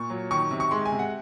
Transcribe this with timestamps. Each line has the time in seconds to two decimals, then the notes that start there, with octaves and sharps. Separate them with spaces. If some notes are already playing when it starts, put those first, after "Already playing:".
Already playing: A#2 C#6
0.10 F#3
0.31 D#3 C#6
0.51 C3
0.60 C#6
0.71 G#3 C6
0.85 G#5
0.92 C3
0.99 F#5